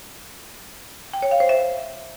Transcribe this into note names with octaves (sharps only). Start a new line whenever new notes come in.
G5
C#5
F5
C5
E5